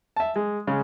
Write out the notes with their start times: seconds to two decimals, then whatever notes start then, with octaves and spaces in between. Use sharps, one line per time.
0.16 E5 A5
0.36 G#3
0.67 C#3 G#3